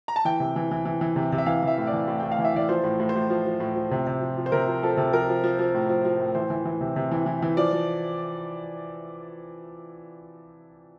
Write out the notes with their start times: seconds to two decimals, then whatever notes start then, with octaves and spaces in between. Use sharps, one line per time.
0.08 A#5
0.16 A5
0.25 E3 G5
0.40 C3
0.56 E3
0.71 E3
0.85 E3
1.01 E3
1.16 C3
1.32 C3
1.38 E5
1.46 E3 F5
1.63 E3 E5
1.78 A2
1.87 D5
1.93 E3
2.08 A2
2.20 A2 G5
2.32 F5
2.39 E3
2.45 E5
2.54 E3 D5
2.69 F3 C5
2.84 A2
3.00 A2
3.09 C5
3.15 A2
3.30 F3
3.46 F3
3.60 A2
3.75 F3
3.91 C3
4.07 C3
4.21 F3
4.37 F3
4.46 C5
4.52 C3 A#4
4.67 F3
4.83 F3 A4
4.97 C3
5.13 F3 A#4
5.29 F3
5.44 F3
5.59 F3
5.74 A2
5.89 F3
6.05 F3
6.20 A2
6.35 E3 C5
6.50 E3
6.65 E3
6.81 C3
6.96 C3
7.11 E3
7.26 E3
7.42 E3
7.57 F3 D5
7.73 F3